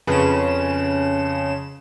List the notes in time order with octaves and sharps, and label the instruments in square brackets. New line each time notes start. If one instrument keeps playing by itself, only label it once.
[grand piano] F2 B4 [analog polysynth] C#3 E7